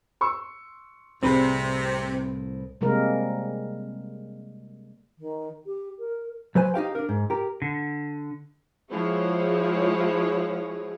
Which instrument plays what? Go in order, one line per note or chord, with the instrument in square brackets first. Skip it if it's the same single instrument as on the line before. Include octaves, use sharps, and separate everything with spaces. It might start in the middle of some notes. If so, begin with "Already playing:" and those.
[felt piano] C6 C#6 E6
[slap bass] C2 A2 [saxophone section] C3 [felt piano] G3 G#4 [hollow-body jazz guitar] C4 B4
[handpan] C3 G3 G#3 A#3 A#4
[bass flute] D#3
G4
A#4
[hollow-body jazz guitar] F#3 B4 C5 G#5
D#4 G4 F5 G5
D4 A#4
G#2
G4 A#4
[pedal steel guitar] D3
[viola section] F3 G#3 E4 F#4 G#4 C#5